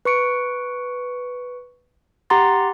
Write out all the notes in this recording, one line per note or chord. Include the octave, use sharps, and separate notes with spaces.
B4 C#6 C#7 D7
G4 F#5 A#5 C6 A6